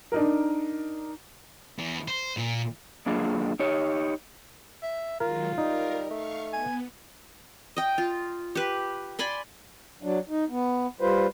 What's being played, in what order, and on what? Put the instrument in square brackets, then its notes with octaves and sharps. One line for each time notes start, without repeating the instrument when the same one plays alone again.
[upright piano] D4 D#4 A#4
[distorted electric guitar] E2
C5
A#2
[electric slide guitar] F#2 A#3 D4 F4 G#4
D#4 G4 C#5
[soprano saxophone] E5
[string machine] D#3 F#3 G#3 [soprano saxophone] F4 [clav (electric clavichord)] A#4
[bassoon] G3 [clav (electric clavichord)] D#4 [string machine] A#4
[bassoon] A3 [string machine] F5 C#6
[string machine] B3 [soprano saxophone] G#5
[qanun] D#5 G5
F4
G4 B4
D5 G#5 B5 C6
[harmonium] F#3 D4
D#4
B3
G3 F4 B4 C5